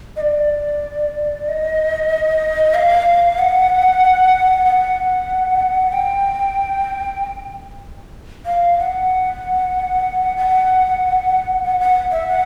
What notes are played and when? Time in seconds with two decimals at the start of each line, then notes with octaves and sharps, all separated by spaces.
0.16 D#5
0.21 D5
1.49 D#5
2.74 F5
3.39 F#5
4.66 F#5
5.92 G5
8.46 F5
8.79 F#5
10.37 F#5
11.63 F#5
11.80 F#5
12.11 E5
12.28 F#5